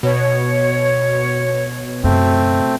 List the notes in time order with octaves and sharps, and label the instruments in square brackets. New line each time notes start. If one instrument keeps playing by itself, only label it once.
[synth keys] B2 [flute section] C#5
[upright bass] F#2 C#3 [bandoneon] A3 C4